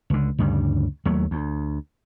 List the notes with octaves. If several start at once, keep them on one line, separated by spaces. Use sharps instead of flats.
C#2 D3
D2 G2 C#3 G3
D#2 F#3 A3
D2